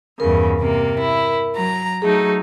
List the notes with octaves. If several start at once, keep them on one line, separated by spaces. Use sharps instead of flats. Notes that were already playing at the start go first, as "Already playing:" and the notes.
E2 G2 C#3 A#4
C3 A#3
E4
F#3 A#5
F#3 A3 D#4 G#4